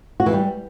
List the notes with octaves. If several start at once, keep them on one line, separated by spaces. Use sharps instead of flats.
F#4
E3
G3